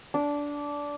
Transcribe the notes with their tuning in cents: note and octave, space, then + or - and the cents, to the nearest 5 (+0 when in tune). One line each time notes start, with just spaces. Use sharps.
D4 -15